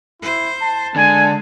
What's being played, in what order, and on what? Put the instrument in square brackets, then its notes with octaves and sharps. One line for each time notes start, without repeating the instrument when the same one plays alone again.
[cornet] E4 [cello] C5
[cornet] A5
[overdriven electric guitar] D3 [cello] G#3 [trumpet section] G#5